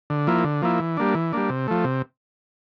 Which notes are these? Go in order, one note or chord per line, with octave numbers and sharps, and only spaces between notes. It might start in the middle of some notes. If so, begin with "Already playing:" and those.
D3
F3 A#3 E4
D3
F3 A#3 E4
E3
G3 A#3 D4
E3
G3 A#3 D4
C3
F3 A3
C3